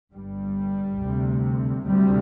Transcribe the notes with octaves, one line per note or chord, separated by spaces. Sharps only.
G1 G2 G3
D2 C3
D2 C3 G3